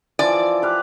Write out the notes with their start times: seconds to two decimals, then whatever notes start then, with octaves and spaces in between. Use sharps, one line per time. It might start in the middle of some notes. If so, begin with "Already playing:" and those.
0.19 E3 F3 D5
0.62 G4 B4 F5